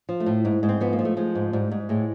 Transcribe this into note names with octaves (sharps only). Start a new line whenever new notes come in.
F3
A3
A2
G#2
G#2
C4
F3 B3
A#3
F3
A3
F3 G#3
G#2
G#2 G3
G#2
A2 G#3